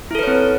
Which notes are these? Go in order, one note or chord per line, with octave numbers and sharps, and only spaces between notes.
C4 E4 A4 B4 C#5